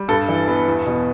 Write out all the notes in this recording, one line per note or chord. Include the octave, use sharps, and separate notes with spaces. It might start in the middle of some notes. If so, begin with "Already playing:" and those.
Already playing: G3
G2 A4
E3
B3
E2
B2